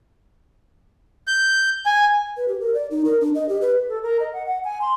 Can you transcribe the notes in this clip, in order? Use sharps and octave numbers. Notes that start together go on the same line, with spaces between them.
G6
G#5
B4
G4
A#4
D5
D#4
A#4
D4
D#5
G4
B4
A4
A#4
D#5
F#5
F#5
G#5
C6